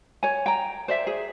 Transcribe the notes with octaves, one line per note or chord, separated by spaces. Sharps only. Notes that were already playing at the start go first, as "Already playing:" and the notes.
C#5 G#5
G5 A#5
C5 D5 E5
G#4